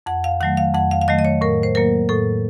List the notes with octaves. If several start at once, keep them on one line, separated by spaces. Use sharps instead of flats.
F2 F#5
F5
D#3 F#3 A3 F#5
F5
F2 F#5
F5
F5
D#3 F#3 A3 D#5
D#5
C#5
A2 A#4
C5
F#3 A#3 A#4
A2 A4